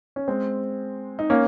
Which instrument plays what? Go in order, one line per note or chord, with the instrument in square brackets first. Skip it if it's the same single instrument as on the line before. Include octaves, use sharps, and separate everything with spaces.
[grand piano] C#4
G#3 C4
D#4
A#3 C#4